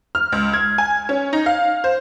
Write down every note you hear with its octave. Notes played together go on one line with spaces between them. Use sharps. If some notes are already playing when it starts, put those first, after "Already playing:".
F6
C#2
G#6
G#5
C#4
D#4
F5
C5